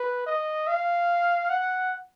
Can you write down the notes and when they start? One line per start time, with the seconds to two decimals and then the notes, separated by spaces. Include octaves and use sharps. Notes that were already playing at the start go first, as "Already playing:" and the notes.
Already playing: B4
0.26 D#5
0.67 F5
1.50 F#5